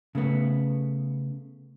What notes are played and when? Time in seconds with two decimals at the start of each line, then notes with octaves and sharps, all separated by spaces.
0.15 C#3 A3 B3